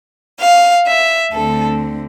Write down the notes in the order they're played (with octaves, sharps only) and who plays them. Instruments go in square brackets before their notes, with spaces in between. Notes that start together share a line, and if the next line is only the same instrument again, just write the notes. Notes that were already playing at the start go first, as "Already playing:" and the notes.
[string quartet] F5
E5
D2 D3 A3 C4 A4